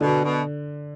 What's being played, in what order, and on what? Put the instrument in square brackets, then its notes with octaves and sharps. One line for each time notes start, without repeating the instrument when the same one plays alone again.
[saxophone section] B2 [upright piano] D3
[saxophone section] B2